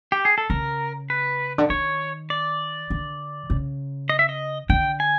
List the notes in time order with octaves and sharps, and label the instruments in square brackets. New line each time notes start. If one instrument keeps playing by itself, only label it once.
[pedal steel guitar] G4
G#4
A4
[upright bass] C#3 [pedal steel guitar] A#4
[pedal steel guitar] B4
[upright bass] D3
[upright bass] D#3 [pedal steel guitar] C#5
[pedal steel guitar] D5
[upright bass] D3
C#3
[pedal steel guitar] D#5
E5
D#5
[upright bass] D3 [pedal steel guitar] G5
[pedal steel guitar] G#5